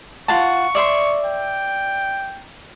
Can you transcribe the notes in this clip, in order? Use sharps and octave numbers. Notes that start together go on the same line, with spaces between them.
F4 F#5 A5 C#6
D5 E5 C6
G5